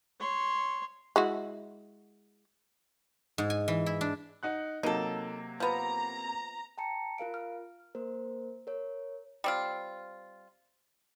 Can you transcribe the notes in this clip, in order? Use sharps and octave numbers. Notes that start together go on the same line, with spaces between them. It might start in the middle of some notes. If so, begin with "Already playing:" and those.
C#5 C6
G#3 E4 F#4
G#2
G#5
E3
E4
D4
D#4 F#5 F#6
C3 F#3 A#3 D#4 A4
F3 B3 A#5
G5 A5 A#5 C#7
F4 A#4 F5 D7
F6
A#3 A#4 C5
A#4 C#5
G3 C4 F4